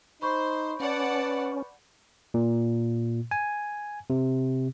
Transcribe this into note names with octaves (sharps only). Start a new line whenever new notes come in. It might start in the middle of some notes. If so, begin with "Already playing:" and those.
D#4 C5 B5 C#6 G6
C#4 B4 D5 F#5 A5
A#2
G#5
C3